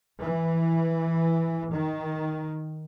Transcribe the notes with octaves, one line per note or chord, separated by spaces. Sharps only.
E3
D#3